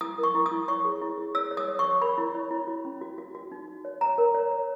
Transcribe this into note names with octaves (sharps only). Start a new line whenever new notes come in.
E4 D#6
A#4
C#6
E4
D#6
E4
C#5 C#6
G#4
E4
G#4
C#5 E6
C#5
D#6
C#5
C#6
C#5
A#4 B5
E4
C#5
E4
F#4
C#4
F#4
F#4
F#4
D#4
D#4
C#5
C#5 A#5
A#4
C#5
C#5